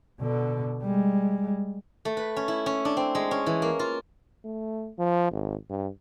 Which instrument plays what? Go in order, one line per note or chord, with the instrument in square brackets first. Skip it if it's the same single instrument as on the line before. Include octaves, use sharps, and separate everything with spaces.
[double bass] B2 D3
G3 G#3
[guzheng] A3
B4
C#4
E4
C#4
D4
C4
G#3
C#4
E3
A#3
F4
[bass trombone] A3
F3
G#1
G2